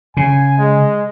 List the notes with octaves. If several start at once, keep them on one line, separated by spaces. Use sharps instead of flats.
C#3 G#5
G#3